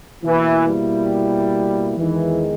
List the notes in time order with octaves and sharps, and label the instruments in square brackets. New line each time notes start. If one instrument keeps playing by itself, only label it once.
[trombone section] B2 A#3 E4 [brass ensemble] E3
[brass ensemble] G3
[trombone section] E2 D#3 G#3 D#4 [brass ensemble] E3